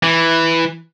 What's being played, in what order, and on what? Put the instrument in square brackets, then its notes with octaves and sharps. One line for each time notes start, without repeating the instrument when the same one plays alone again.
[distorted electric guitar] E3